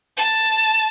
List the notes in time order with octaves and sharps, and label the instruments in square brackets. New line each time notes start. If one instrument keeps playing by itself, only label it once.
[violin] A5